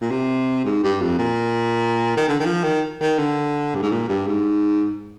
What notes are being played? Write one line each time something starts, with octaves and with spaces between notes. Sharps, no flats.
A#2
C3
G#2
G2
F2
A#2
D#3
D3
D#3
F3
D#3
D#3
D3
G2
G#2
A#2
G2
G#2